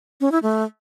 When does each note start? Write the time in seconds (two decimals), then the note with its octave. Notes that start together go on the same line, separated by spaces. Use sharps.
0.21 C#4
0.32 E4
0.43 A3